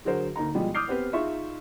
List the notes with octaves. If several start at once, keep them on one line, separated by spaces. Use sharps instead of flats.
D3 F#3 F#4 G#4 A#4 C5
D2 A#3 D#4 A#5
B2 F3 G3 G#3
D6 D#6 F6 G6 C7
B3 C4 G4 B4
D#4 F4 G#4 E5 C#6